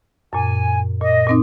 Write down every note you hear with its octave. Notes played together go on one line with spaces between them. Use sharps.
F#2 A#2 G#5
A#2 D#5
A#2 C4 D#4